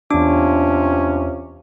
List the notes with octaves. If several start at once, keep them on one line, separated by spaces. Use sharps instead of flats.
E2 C3 C#4 D4 F4 D6